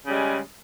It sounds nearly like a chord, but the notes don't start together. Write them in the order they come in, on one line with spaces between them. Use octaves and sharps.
C#3 G3 G#3